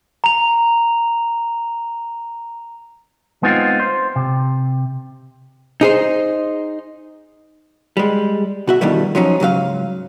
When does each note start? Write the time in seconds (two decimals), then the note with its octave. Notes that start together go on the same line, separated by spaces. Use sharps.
0.24 A#5 F7
3.43 G#3 B3 C4 D#4 F4
3.80 C5
4.16 C3
5.81 D#4 G#4 C5
7.97 G3 G#3
8.67 B2 F#4 E5
8.81 G2 B2 D#3 E3 G3 A3
9.15 F3 F#3 C#4 D#4
9.40 C#2 G#2 F#3 F5